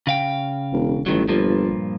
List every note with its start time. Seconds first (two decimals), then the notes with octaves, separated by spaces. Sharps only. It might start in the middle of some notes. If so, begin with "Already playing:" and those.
0.07 C#3 F5 G5
0.72 E1
1.06 A1 G2 D#3 F#3
1.28 G1 G2 A#2 F3